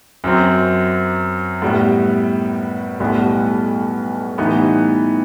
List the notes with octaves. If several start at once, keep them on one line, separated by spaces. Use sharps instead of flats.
F#2 F#3 C4
A2 G3 B3
B1 A2 G3 B3
A2 E3 G3 B3 D#4